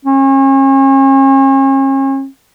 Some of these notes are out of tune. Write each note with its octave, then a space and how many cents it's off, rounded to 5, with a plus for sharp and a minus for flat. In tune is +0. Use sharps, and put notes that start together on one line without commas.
C#4 -40